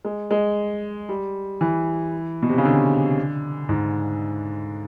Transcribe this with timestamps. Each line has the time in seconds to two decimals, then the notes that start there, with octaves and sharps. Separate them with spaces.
0.05 G#3
0.31 G#3
1.09 G3
1.61 E3
2.42 B2
2.49 C3
2.58 C#3
2.65 D3
3.69 G#2